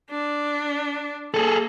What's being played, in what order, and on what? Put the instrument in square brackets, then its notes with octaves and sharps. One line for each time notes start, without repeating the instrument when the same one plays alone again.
[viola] D4
[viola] A#3 [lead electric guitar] G#4 A4